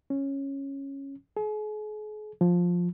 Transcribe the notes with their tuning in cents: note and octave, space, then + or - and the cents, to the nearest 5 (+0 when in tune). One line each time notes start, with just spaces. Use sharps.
C#4 -10
G#4 +40
F3 +10